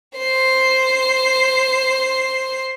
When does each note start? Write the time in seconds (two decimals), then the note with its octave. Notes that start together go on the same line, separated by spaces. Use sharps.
0.17 C5 C7